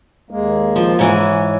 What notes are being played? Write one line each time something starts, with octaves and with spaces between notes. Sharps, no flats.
D#2 G#3 A#3
F3
G#2 E3 C#5 G#5